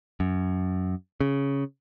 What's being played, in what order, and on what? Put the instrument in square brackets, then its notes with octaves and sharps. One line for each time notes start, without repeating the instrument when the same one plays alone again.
[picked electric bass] F#2
C#3